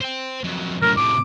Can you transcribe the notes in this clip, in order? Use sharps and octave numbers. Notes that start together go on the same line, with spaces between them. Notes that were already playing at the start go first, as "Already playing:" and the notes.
C5 G5
F2 F#3
F#2 A2 A#4
A2 C3 D6